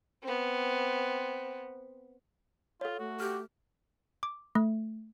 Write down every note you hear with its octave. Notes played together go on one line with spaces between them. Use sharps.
B3 C4
F4 A4 C#5
A3 F#4
G4 F6
D6
A3